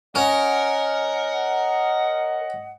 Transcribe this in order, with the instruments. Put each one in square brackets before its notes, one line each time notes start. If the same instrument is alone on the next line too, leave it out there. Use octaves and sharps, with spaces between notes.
[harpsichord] C#4 [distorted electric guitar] A#4 [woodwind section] D#5 F#5